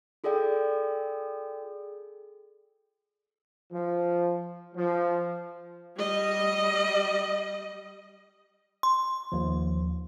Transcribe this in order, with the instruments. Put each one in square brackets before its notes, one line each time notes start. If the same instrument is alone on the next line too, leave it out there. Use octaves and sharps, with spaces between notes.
[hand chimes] F4 G#4 A4 D5 G5
[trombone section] F3
F3
[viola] G3 D#5
[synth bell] C6
[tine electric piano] D#2 F3